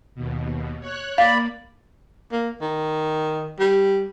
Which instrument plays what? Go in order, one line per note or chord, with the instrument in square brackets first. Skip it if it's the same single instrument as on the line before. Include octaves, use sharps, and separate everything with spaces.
[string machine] D#2 B2
C#5 F#6
[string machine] A#3 [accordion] D5 B5 [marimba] F5
[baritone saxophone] A#3
D#3
G3